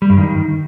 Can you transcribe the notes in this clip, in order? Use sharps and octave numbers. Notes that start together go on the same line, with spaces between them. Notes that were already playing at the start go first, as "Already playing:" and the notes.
G3
G2
D#3